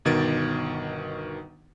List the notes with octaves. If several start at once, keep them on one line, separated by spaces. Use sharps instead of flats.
G1 B2 D#3 G#6 A6 D7